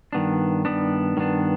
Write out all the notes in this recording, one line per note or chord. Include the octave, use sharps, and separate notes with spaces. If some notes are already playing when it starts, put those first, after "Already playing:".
G2 D#3 B3 D4
G2 D#3 B3 D4
G2 D#3 B3 D4